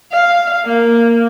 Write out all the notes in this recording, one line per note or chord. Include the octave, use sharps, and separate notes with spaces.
F5
A#3